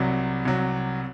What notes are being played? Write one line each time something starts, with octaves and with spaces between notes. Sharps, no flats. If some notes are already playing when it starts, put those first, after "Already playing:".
Already playing: C2 C3 F#3
C2 C3 F#3